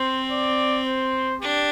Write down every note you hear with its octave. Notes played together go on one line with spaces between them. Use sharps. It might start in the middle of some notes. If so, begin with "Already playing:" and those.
Already playing: C4 C5
D5
C5
D4 G4